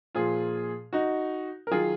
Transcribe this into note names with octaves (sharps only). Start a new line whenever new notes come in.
A#2 F3 F4 G#4
D#4 F#4
A#4
D#3 F#3 F4 G#4